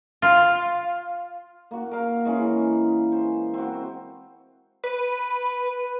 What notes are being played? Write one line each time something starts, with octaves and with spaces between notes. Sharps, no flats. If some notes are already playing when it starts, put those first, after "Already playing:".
F4
A#3 F#4
A#4 F5
E3 G#3 C#4
C5
C4 F#4
B4